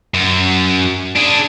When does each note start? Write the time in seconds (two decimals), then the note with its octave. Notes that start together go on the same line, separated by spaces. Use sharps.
0.14 F#2
1.16 D4 G#4